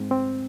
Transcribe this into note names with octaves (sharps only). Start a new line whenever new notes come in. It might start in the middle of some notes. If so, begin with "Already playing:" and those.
Already playing: G#2 C4
C4